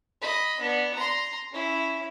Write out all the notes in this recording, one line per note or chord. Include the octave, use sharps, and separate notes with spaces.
D#5 B5
B3 D4
A#5 C6
C#4 E4